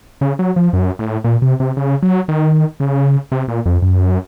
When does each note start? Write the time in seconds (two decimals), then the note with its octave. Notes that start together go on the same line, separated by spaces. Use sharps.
0.21 C#3
0.39 F#3
0.56 F3
0.73 F#2
0.99 A2
1.24 A#2
1.42 C3
1.60 C3
1.77 C#3
2.03 F#3
2.28 D#3
2.80 C#3
3.32 C3
3.48 A#2
3.66 F2
3.82 F#2